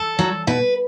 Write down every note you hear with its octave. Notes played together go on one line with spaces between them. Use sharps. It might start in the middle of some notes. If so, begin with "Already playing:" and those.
Already playing: A4
F#3
B2 B4